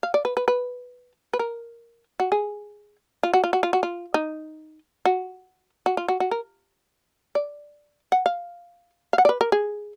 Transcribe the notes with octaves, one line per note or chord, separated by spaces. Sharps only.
F5
D5
B4
B4
B4
B4
A#4
F#4
G#4
F4
F#4
F4
F#4
F4
F#4
F4
D#4
F#4
F#4
F4
F#4
F#4
A#4
D5
F#5
F5
F5
F#5
D5
B4
A#4
G#4